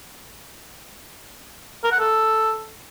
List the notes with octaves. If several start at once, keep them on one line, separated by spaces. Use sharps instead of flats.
A#4
F#5
A4